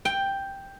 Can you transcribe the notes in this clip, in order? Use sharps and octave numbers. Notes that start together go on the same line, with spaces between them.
G5